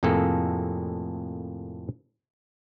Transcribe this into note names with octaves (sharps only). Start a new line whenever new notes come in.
F2 A2 C3 A#3 G#4 A4